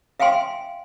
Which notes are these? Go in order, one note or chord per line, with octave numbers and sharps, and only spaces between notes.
E5 F5 G5 G#5 C6